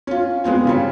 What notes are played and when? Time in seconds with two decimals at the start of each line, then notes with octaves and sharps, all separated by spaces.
0.07 C#4 F4
0.44 G#3 B3 C4 F4
0.65 C#3 G3 C#4